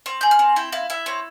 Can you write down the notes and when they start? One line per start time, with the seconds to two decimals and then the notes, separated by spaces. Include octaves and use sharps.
0.06 C4 C#6
0.21 G#4 G6
0.31 F6
0.39 C4
0.56 E4 G5
0.72 E4 F5
0.90 E4 E5
1.06 C4 C#5